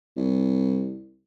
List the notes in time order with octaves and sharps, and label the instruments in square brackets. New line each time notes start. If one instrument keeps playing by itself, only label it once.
[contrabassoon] C2